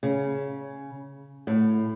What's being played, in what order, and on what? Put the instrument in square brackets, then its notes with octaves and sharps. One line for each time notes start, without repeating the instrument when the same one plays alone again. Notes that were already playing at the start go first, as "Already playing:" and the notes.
[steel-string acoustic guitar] C#3
A2